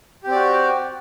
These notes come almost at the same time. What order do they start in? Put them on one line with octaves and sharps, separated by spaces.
G4 C4 D5 F#4